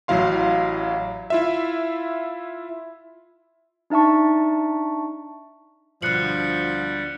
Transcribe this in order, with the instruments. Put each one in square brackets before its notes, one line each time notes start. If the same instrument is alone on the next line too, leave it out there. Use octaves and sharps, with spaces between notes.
[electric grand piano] A1 F#3 E4 F5 C6
E4 F4 E5
[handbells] D4 D#4 E5 A5 C#6
[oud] D2 B2 [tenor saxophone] F3 [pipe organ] G3 [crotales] F#6 C#7 F#7